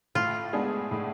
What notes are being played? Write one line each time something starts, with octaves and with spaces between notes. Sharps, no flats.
A2 F4
G#3 B3 D4 G#4
A2